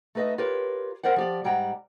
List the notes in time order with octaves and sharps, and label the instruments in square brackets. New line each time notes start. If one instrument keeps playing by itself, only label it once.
[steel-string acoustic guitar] A3 D#4 B4 D#5 E5
F4 G4 A#4 B4 C#5
C4 A#4 C5 D5 F#5
F3 G4 D5
G#2 G3 F#5 G5 A#5